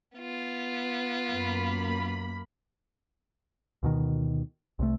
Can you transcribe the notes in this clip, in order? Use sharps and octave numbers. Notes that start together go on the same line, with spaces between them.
B3 F4
F#2 A#3 B5
D2 B2 D#3
C2 C3 A3